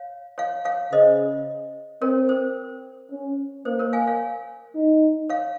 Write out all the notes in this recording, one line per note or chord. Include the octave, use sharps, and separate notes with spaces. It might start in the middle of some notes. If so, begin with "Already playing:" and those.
Already playing: C#5 F5
C#5 F5
C#5 F5
C#3 C5 D#5
C4 A#4 C#5
C5
C#4
A#3 C5
A#4 C#5
F5 G#5
C#5 F5
D#4
C#5 F5